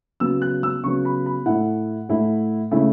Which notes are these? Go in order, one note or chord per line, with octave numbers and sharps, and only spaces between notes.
C#3 F#3 B3 E6
F#6
E6
C#3 F#3 B3 C#6
B5
B5
A2 A3 E4 F#5
A2 A3 E4
C#3 A3 E4 E5